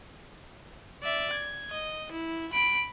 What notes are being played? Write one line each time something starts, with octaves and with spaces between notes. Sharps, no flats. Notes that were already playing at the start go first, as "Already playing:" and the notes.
D5 E5
G#6
D#5
E4
B5 D7